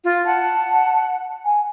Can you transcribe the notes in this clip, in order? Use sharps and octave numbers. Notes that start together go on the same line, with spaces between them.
F4
F#5 A5
G#5